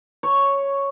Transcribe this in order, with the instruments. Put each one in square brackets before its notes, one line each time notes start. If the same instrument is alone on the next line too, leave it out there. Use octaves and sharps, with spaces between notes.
[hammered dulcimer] C#5